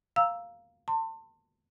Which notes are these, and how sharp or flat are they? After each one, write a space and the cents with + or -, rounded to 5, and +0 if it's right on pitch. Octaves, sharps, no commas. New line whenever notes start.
F5 +0 A#5 +0 E6 +0
A5 +35 C6 +0